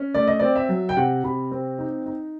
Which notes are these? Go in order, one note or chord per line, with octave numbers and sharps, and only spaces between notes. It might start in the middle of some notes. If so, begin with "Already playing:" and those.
Already playing: C#4
A3 D5
D#5
C4 D5
E5
F#3
G5
C3 F#5
C3 B5
C4
D#4
D#4